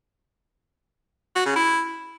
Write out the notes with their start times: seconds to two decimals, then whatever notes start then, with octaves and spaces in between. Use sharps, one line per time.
1.36 F#4
1.46 C#3
1.56 E4